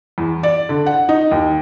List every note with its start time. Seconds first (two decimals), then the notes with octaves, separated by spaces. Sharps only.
0.18 E2
0.43 D5
0.69 D3
0.86 F#5
1.09 D#4
1.31 D#2